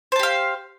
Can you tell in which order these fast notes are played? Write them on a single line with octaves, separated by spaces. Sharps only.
C5 A5 G4 F5